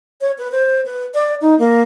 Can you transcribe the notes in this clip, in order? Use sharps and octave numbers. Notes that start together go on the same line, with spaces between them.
C#5
B4
C5
B4
D5
D#4
A#3